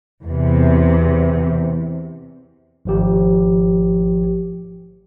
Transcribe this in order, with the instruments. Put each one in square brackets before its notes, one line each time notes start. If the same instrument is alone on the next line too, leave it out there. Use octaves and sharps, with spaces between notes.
[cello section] E2 C3
[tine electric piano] G#1 F3 G4